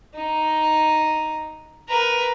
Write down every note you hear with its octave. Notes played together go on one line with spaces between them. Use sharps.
D#4
A#4 B4